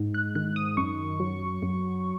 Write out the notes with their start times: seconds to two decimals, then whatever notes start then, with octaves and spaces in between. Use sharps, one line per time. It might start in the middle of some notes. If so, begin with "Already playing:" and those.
Already playing: G#2
0.14 F#6
0.35 D#3 F#6
0.56 D#6
0.77 F#2 C#6
1.20 F#3
1.63 F#2